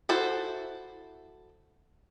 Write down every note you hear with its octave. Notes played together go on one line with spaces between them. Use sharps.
E4 F#4 A4 C5